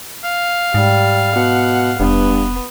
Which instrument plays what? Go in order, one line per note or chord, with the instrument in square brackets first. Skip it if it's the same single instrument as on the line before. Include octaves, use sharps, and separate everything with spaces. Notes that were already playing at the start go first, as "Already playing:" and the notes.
[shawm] F5
[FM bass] G#2 [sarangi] G3
[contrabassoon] B2 [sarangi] F#5
[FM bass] F1 [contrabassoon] G2 [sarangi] B3